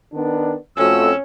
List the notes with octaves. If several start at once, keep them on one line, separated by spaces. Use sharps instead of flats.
D#3 B3 D4
F2 A3 C#4 F#4 E6